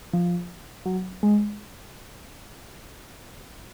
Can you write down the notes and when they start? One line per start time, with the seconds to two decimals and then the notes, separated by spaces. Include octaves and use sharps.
0.13 F3
0.86 F#3
1.23 G#3